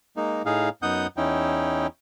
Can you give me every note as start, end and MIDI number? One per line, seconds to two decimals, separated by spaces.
0.17 0.42 56
0.17 0.42 58
0.17 0.42 63
0.46 0.69 45
0.46 0.69 63
0.46 0.69 68
0.46 0.69 77
0.82 1.07 42
0.82 1.07 59
0.82 1.07 63
0.82 1.07 78
0.82 1.07 87
0.82 1.07 91
1.17 1.87 40
1.17 1.87 61
1.17 1.87 63
1.17 1.87 64
1.17 1.87 79